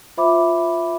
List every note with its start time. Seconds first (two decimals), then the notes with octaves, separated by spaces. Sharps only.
0.17 F4 C5 E5 B5 D6